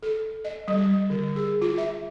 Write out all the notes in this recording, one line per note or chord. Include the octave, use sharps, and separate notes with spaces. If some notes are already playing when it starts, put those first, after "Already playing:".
A4
D#5
G3
D3
G#4
F4
E5